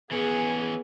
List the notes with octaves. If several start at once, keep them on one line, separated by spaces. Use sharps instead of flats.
E3 B3 C#4 G#4